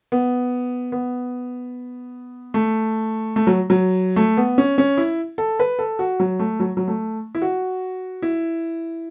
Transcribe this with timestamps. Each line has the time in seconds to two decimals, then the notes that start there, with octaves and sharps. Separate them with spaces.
0.12 B3
0.92 B3
2.54 A3
3.36 A3
3.47 F#3
3.70 F#3
4.16 A3
4.37 B3
4.58 C#4
4.78 C#4
4.97 E4
5.38 A4
5.60 B4
5.79 A4
5.99 F#4
6.20 F#3
6.39 A3
6.60 F#3
6.77 F#3
6.88 A3
7.35 E4
7.42 F#4
8.22 E4